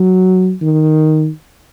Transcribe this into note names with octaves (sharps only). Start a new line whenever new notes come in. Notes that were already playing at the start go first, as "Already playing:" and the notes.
Already playing: F#3
D#3